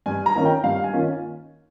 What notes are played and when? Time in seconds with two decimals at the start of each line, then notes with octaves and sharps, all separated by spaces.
0.06 G2 G#5
0.26 A#5
0.36 D#3 A#3 C#4 F4
0.45 G5
0.64 G2 F5
0.84 G#5
0.93 D#3 A#3 C#4 F4